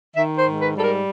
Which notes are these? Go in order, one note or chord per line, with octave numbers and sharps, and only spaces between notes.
D#3 E5
C5
G#2
B4
G3 A4
A#4